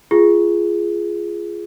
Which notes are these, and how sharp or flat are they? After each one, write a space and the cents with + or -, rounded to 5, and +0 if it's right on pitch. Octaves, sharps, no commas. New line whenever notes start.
F4 -20 G#4 +0